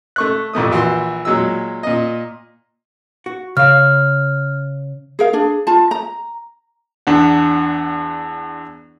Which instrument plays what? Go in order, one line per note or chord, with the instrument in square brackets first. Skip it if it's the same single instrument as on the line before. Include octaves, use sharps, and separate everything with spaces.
[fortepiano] A3 C#6 F#6
A1 F2 A3 D#6
A#1 E3 F#4 C6
A#2 F#3 G#3 E6
A#2 D#5
[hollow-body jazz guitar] F#4
[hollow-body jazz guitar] C#3 F5 [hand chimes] F6
[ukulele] G#4 A#4 F5
D4 G#4
F4 A5
A#5
[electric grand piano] E2 D4 F#5